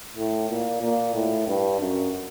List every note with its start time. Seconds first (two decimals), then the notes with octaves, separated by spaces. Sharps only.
0.17 A2
0.50 A#2
0.82 A#2
1.14 A2
1.48 G2
1.81 F#2